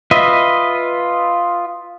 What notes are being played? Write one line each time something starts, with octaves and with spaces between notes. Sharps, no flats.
F4 B4 D#5 E5